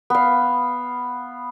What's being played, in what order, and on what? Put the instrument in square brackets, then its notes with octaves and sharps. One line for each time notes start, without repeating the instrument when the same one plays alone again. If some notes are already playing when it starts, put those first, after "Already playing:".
[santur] B3 F5